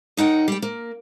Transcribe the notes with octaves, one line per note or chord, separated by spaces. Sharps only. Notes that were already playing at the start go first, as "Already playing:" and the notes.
D#2 D#4 F#5 G5
G3 G5
A#3